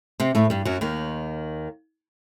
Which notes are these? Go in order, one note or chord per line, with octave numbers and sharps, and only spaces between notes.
C3 C4
A2 A3
G2 G3
F#2 F#3
D#2 D#3